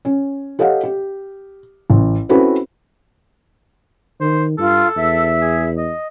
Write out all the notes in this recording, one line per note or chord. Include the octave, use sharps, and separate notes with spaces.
C#4
G4 A4 C#5 D#5 F5 F#5
G4
A1
C4 C#4 E4 F#4 A4 B4
D#3 C5
G2 F4 A4
E2 E5
G#4
D#5